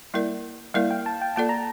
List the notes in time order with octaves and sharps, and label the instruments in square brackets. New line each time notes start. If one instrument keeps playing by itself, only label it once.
[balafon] G3 A#3 E4 A#4 D5
[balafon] G3 A#3 E4 A#4 D5 [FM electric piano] F5
[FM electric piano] G5
A5
G5
[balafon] A#3 F4 A4 D5 [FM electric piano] A5
[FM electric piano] A#5